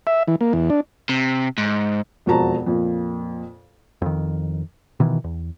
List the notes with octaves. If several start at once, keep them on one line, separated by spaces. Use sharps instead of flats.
E5
E3
A#3
E2
D4
C3
G#2
E1 F2 F#4 C5 A5 A#5
F2 A#2
F2 D#3
B2 D#3 E3
E2